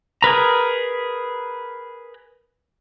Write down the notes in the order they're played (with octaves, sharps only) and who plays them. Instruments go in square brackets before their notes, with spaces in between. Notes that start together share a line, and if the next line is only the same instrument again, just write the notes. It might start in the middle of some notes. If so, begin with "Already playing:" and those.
[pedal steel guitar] G#4 A#4 B4 A#5